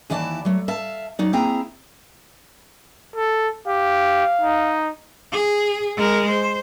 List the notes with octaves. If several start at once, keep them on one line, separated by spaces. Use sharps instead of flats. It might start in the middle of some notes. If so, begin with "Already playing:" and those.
D#2 E3 E4 D5 A5
F#3 A3
E5 F5 A5
F#3 D#4 D5
A#3 C4 E4 G#4 G5 A#5
A4
G4 F5
D#4
G#4
G#3 A#4
C5